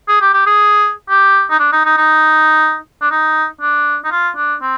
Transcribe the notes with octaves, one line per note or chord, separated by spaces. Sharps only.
G#4
G4
G4
G#4
G4
D#4
D4
D#4
D#4
D#4
D4
D#4
D4
D#4
F4
D4
C4